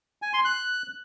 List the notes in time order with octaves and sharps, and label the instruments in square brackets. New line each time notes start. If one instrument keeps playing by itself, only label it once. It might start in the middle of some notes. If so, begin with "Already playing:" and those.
[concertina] G#5
C6
F#6